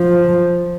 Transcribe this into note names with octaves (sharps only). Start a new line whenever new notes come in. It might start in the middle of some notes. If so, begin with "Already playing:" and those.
Already playing: F3